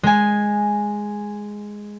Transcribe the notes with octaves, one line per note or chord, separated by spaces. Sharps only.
G#3 G#5